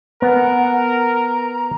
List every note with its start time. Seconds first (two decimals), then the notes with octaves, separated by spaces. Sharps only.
0.22 B3 A#4 F#5
0.92 A#5